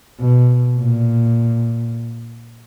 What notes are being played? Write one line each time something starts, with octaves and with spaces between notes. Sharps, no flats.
B2
A#2